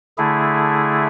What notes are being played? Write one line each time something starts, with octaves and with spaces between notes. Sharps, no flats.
D3 A3 E4 G#4